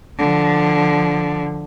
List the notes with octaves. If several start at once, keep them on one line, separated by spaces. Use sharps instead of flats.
D3 F3